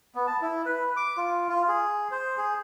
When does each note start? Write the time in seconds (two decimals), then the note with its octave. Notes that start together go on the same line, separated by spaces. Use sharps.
0.15 B3
0.27 A5
0.42 E4
0.66 B4
0.97 D6
1.17 F4
1.49 F4
1.69 G#4
2.11 C5
2.37 G#4